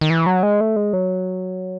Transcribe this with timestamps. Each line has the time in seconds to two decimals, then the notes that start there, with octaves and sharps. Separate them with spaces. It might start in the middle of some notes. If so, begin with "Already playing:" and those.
0.01 D#3
0.10 E3
0.26 F#3
0.43 G#3
0.61 A3
0.76 G#3
0.93 F#3